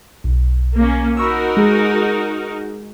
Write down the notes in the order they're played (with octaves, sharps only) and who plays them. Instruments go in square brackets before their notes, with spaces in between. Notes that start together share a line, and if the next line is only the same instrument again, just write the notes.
[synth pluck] B1
[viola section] A#3 C#4
[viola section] D#4 F#4 A#4 [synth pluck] B5 C#6 E6
[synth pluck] G#3 G#4